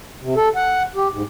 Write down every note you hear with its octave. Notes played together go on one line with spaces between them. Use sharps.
C3
A4
F#5
G4
G#2